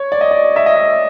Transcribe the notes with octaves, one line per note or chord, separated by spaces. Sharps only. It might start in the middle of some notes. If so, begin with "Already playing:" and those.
Already playing: C#5
D5
D#5
D5
E5
D#5
E5